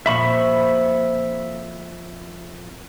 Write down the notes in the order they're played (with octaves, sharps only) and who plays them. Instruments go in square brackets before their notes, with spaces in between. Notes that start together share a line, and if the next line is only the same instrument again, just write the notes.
[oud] F2 A#2 F3 [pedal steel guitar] E5 B5 C#6